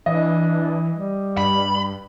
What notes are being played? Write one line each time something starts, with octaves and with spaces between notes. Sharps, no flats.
E3 D4 D#5
G3
G2 B5